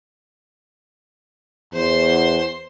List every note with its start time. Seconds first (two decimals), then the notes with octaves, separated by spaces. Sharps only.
1.73 E2 C5 C6